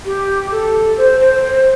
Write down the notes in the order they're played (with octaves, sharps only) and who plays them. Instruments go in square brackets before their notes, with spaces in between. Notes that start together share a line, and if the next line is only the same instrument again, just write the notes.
[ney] G4
A4
C5
C5
C5